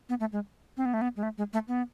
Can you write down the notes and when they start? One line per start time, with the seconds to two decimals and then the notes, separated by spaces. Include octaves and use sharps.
0.09 B3
0.20 A3
0.32 G#3
0.77 C4
0.85 B3
0.94 A3
1.01 B3
1.16 G#3
1.23 A3
1.38 G#3
1.53 A3
1.68 B3